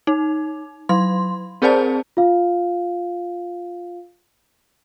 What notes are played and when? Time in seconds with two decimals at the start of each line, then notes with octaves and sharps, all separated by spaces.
0.07 D#4
0.89 F#3 C6
1.62 C4 G#4 A#4 C5 D5 A5
2.17 F4 F5